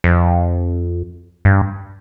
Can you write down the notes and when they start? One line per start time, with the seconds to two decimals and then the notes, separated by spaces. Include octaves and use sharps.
0.04 F2
1.45 G2